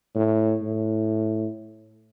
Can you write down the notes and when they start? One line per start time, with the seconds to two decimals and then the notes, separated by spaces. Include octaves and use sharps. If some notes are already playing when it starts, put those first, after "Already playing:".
0.15 A2
0.63 A2